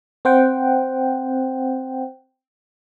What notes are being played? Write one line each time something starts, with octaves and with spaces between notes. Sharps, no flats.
C4 C5 F#5 G5